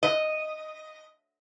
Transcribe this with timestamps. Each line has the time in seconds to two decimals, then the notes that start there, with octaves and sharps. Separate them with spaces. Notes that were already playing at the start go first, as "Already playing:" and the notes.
0.03 D#5